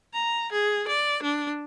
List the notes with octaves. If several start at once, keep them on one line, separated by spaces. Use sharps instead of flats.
A#5
G#4
D5
D4